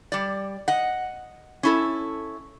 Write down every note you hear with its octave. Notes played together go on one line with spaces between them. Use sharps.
G3 D5
D#5 F#5
C#4 E4 A4